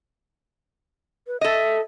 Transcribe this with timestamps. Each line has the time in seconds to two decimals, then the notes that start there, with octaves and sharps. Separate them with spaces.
1.27 B4
1.41 A4 D#5 E5